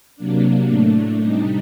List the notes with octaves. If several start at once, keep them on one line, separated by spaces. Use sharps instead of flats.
C3 F#3 A#3 D4
A2 A3 D4
C3 G3 D4 D#4